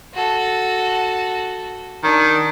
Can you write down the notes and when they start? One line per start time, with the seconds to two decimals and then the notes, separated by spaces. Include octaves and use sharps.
0.14 F#4 A4
2.03 D#3 D4